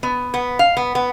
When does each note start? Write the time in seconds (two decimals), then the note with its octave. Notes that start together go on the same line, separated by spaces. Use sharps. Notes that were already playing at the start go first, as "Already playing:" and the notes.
0.03 B3
0.34 B3
0.59 F5
0.77 B3
0.95 B3